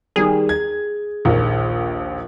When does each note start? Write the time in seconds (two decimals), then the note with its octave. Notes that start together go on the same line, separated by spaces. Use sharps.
0.16 D#3 G3 G#4
0.49 G#6
1.25 A#1 D#2